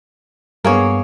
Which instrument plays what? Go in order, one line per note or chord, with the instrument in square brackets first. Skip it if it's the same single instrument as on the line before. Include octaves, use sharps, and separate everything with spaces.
[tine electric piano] G2 B3 [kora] A#3 G#4 C#5